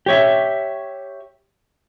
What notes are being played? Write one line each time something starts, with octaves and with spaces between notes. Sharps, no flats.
G4 C#5 E5